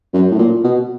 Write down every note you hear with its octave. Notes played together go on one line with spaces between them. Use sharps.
F#2
A2
A#2
B2